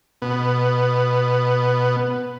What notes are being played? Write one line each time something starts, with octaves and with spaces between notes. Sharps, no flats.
B2 B3